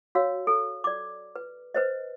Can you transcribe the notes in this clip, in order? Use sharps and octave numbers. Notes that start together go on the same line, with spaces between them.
F#4 C#5 F5 E6
A4
D5 D6
B4
B4 C5 D#5